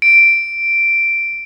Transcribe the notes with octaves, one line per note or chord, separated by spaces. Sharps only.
D7